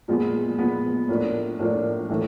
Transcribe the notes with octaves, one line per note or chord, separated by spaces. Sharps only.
A#2 F3 G#3 B3
A#2 F3 G#3 B3
A2 F3 A#3 D4
A2 F3 A#3 D4
A2 E3 A3